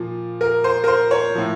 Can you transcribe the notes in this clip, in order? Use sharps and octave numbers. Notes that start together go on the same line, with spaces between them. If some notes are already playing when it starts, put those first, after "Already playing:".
Already playing: A#2 F3
A#4
C5
A#4
C5
C#5
A2 F3